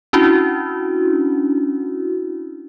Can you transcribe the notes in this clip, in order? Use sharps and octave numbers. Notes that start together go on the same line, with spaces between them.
C#4 D4 E4 F#4